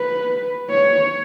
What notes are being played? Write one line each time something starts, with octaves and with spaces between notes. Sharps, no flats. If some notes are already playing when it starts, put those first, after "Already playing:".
Already playing: B4
C#5